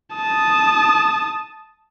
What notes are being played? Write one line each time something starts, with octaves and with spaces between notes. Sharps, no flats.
A5 D#6